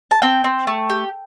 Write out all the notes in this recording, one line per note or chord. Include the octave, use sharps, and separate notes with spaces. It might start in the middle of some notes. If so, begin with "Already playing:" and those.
A5
C4 G5
C4
A3
G4